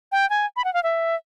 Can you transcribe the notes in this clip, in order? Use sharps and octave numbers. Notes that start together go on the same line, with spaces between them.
G5
G#5
B5
F#5
F5
E5